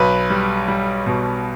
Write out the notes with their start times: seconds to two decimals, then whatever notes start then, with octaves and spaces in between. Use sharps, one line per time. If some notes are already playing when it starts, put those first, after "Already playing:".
Already playing: B1 B4
0.30 G3
0.68 G3
1.06 B2